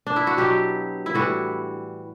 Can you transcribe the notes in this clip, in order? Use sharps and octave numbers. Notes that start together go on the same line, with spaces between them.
D4
E4
F#4
B2 F#3 G4
E4
A2 E3 G3 F#4